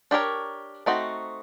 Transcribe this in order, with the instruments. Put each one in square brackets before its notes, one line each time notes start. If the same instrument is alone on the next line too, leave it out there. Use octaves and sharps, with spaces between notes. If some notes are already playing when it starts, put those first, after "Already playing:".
[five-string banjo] D4 G4 A#4 C#5
A3 C4 D#4 F#4